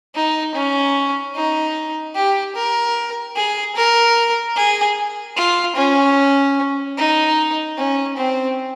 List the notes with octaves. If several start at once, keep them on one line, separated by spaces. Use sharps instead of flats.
D#4
C#4
D#4
G4
A#4
G#4
A#4
G#4
F4
C#4
D#4
C#4
C4